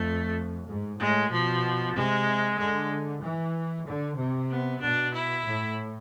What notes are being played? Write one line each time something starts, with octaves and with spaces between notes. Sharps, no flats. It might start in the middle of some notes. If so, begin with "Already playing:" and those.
Already playing: F2 A3
G#2
A2 G#3
B2 F3
C3 G#3
D3 G#3
E3
D3
C3
B3
B2 D4
E4
A2